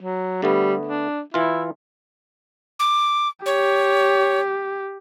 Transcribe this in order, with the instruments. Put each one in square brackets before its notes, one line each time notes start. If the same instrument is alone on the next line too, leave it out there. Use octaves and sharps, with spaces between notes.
[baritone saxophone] F#3
[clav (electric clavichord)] D3 A3 B3 [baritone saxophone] G3
[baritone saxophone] D4
[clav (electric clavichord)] E3 F4 [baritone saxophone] E4
[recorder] D6
[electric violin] G4 [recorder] C#5